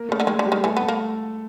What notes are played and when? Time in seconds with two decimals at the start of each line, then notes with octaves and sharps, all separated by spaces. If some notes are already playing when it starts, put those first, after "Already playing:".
Already playing: A#3 A#4
0.09 C#3 A3 A4
0.20 D3
0.27 D#3 G#3 G#4
0.39 D3
0.45 G3 G4
0.52 D#3
0.64 E3 A3 A4
0.77 B3
0.82 A3 A4
0.88 A#3